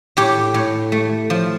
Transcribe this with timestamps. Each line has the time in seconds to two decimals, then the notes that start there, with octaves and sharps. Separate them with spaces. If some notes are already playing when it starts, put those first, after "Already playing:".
0.17 A2 G4
0.54 A2
0.92 A3
1.30 F3